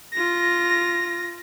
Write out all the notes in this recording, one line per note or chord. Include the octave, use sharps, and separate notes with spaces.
F4 A#6